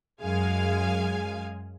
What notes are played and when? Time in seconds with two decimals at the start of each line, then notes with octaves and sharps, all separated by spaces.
0.20 F#2 F#3 G#3 F5 G#5